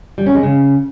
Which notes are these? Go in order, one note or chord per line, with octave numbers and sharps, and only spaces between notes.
G3
C#4
G#3
C#3